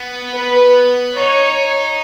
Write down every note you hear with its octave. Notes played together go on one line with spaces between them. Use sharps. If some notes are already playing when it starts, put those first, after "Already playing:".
Already playing: B3
B4
D#4 C#5